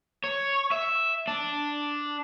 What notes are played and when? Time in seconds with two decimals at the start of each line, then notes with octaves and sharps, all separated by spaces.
0.24 C#5
0.72 E5
1.28 D4